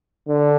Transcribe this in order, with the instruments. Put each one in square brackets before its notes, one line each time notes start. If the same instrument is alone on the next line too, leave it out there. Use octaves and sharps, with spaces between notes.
[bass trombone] D3